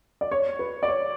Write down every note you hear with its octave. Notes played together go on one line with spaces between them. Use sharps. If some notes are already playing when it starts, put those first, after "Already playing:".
D5
C#5
B4
D5
C#5